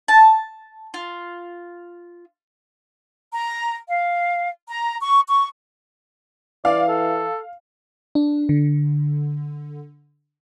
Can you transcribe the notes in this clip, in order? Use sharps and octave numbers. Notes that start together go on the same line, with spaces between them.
A5
F4
A#5
F5
A#5
C#6
C#6
E3 D5 F5
A4
D4
D3